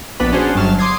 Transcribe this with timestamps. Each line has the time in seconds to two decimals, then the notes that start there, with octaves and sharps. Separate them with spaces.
0.20 A#1 B3 D4 B4 B5
0.33 C#4 D4 F#4 G#4 C5
0.55 G1 G2 F#3 A5 F6
0.79 C6 D6 D#6 G#6 C7